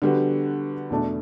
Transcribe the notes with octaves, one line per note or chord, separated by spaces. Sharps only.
D3 G3 B3 F#4
E2 B2 A3 D4